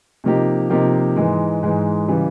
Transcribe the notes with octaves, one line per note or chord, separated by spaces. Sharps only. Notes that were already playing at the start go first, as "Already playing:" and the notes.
C3 F3 A#3 D#4 G4
C3 F3 A#3 D#4 G4
G#2 E3 G#3
G#2 E3 G#3
C#3 E3 G3